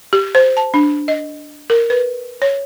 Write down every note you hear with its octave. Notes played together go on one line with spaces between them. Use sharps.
G4
C5
A5
D4
D#5
A#4
B4
C#5